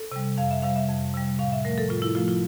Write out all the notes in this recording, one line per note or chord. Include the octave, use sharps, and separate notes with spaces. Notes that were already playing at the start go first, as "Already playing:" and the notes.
Already playing: A4
C3 G3
F2 F5
E5
C3 G3 F5
E5
F2
C3 G3
A2 F5
E5
F3 A3 A#4
A4
A2 F4
E4
F3 A3 F4
F4